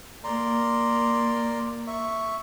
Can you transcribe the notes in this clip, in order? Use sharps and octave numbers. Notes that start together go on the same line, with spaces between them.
A#3 D5 A#5 C6
E5 C#6